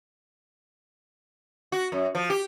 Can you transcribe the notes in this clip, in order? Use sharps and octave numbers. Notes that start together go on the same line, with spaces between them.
F#4
F#2
F3
G4